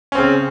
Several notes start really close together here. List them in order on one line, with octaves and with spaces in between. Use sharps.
C#4 C4 C#3